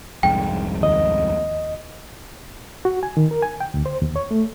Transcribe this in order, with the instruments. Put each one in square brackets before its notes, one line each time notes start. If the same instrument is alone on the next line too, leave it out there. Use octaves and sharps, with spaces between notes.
[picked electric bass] C2 F2 G#2 [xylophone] G5
[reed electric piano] D#2 D#5
F#4
G#5
D#3
A#4
G#5
G5
D2
C5
D#2
C#5
A3